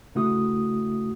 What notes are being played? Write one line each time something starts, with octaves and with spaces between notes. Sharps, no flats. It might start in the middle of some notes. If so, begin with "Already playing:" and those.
C#3 A3 E4 F#4 D#6